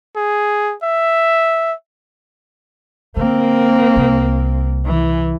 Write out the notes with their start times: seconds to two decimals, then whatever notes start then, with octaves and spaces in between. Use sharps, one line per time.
0.16 G#4
0.83 E5
3.17 D3 A#3 C4
3.96 C2
4.86 E3